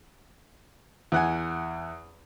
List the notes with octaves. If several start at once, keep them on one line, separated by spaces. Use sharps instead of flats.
E2 F#5 G#5